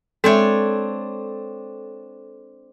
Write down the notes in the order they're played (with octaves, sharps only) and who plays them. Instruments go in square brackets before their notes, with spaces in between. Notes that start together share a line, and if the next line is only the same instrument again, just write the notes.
[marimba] G#3 E5 [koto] C4 D4 C#5 [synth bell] A4